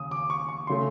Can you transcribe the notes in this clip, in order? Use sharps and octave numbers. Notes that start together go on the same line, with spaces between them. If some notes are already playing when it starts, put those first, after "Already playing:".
Already playing: D#2 C#3 D#6
D6
C#6
C#6
C#3 F#3 A3 C6